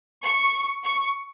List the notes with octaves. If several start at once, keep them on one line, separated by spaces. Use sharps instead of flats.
C#6
C#6